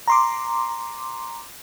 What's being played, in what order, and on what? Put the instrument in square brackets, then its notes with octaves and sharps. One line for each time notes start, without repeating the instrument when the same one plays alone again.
[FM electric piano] A#5 C6 D6